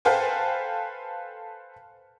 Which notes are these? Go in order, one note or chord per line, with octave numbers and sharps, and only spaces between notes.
A4 B4 C5 F5 G5 G#5